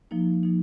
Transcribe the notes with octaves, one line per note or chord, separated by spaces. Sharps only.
F3 A#3 D#4
F3 A#3 D#4